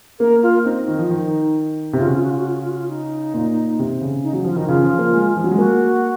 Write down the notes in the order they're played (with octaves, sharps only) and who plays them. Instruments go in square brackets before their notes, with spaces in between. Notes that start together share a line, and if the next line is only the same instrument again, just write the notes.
[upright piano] A#3 [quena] A#4
[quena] F4
[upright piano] C4 [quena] D#4
[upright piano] D#3
F3
D#3
C3
[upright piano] C#3 [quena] F4
[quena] F#4
F4
F#4
F4
F#4
F4
F#4
F4
F#4
F4
D#4
[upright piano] A#2
C3
C#3
[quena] D#4
[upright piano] F#3
[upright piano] F3 [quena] F4
[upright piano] D#3 [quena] D#4
[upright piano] C#3 [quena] F4
[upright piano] F3
A#3
G#3
F3
F#3
G#3
[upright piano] A#3 [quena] F#4